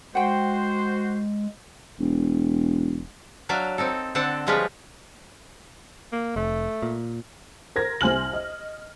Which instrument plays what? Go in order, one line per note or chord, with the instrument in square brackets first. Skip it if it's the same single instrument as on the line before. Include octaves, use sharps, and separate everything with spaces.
[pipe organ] G#3 [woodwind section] F#4 C5 [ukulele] F#5 G5
[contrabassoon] E1
[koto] F#3 D4 D5 E5 F5
C4 D#4 A4
D3 C4 D4 A4 F#5 A5
F3 G3 G#3 F4 B4 C#5
[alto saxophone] A#3
[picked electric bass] F1 [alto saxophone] A3
[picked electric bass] A#2
[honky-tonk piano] A#4 C5 G#6 A#6
C2 C5 G#5 F6 F#7
D#5